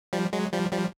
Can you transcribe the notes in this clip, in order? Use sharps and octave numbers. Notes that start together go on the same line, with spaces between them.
F3 G3
F#3 G#3
F3 G3
F3 G3